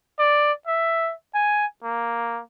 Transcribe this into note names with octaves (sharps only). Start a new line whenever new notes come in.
D5
E5
G#5
A#3